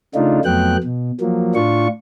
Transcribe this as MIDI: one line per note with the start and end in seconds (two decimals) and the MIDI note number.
0.15 0.40 49
0.15 0.40 57
0.15 0.40 62
0.15 0.40 63
0.15 0.40 65
0.45 0.77 41
0.45 0.77 54
0.45 0.77 57
0.45 0.77 59
0.45 0.77 79
0.45 0.77 90
0.84 1.11 47
1.21 1.55 53
1.21 1.55 54
1.21 1.55 58
1.55 1.88 45
1.55 1.88 62
1.55 1.88 65
1.55 1.88 85